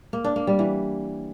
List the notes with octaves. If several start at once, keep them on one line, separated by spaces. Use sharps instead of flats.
A#3
D4
A#3
G3
E3